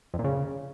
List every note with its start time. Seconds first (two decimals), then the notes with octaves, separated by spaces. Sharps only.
0.14 F2
0.19 A#2
0.24 C#3